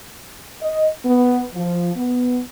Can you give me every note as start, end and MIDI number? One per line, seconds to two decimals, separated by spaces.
0.61 0.87 75
1.05 1.45 59
1.54 1.91 53
1.96 2.40 59